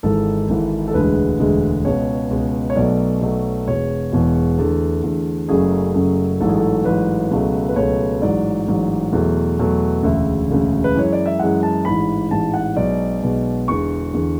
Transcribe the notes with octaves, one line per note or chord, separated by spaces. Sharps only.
G#1 G#2 E3 A4
G#1 G#2 E3
A4
E1 D2 D3 G#3 B4
E1 D2 D3 G#3
C#2 B2 G#3 C#5
C#2 B2 G#3
C#5
B1 B2 F#3 A3 D5
B1 B2 F#3 A3
E1 E2 B2 C#5
E1 E2 B2
E2 D3 A3 A4
E2 D3 A3
F#1 F#2 C#3 F#3 A3 G#4
F#1 F#2 C#3 F#3 A3
A1 G#2 F#3 A3 A4
G#4
A4
A1 G#2 F#3 A3 B4
C#2 B2 F#3 A3
B4
C#2 B2 F#3 A3 C#5
A1 G#2 F#3 D5
A1 G#2 F#3
E2 B2 F#3 A3
E2 B2 F#3 A3
E1 D2 C#3 E5
E1 D2 C#3
B4
F#2 E3 G#3 C#5
D5
E5
F#2 E3 G#3 F#5
A5
A1 G#2 E3 B5
A1 G#2 E3 A5
F#5
B1 B2 G#3 D5
B1 B2 G#3
E1 E2 D3 C#6
E2 D3